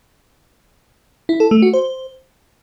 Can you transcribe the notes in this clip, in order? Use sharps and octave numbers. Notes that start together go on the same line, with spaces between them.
E4
A4
A3
F#4
C5